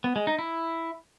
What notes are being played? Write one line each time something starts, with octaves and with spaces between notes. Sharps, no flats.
B3
G#3
D#4
E4